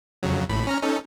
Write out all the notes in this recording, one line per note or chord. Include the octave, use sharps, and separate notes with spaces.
F2 C#3 F#3
A1 A2 B5
C#4 A#5 F6
C#4 D#4 A4